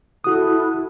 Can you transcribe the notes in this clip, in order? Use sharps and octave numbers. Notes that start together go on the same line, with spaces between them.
E4 F#4 A4 D#6 F#6